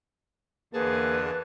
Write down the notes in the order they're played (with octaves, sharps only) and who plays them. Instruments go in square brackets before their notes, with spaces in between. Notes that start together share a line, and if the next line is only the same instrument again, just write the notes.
[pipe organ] E2 D3 A5 [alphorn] A#3 [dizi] G#4 [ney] B4